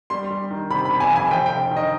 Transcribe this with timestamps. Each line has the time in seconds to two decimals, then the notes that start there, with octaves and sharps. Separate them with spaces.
0.10 G3 C6
0.31 G3
0.51 D#3
0.70 C3 B5
0.85 B5
0.91 C3
1.00 G#5
1.10 F2
1.16 G#5
1.31 F1 G5
1.46 G5
1.52 F1
1.71 D#3
1.77 D#5